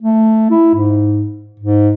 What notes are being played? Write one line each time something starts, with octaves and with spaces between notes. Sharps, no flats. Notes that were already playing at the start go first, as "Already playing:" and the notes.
A3
E4
G#2
G#2